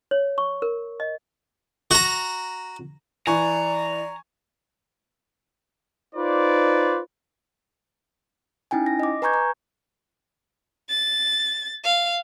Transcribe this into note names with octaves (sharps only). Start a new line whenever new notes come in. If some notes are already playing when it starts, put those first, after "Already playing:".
C#5
C#6
A#4
D#5
F#4 A#5
E3 D5 G#5 A#5 C#6
D#4 F4 B4 C5 D5
C#4 D#4 E4 G5 G#5
A#6
D#5 D6
B4 G#5 A#5 C#6 G6 G#6
A#5
A6
F5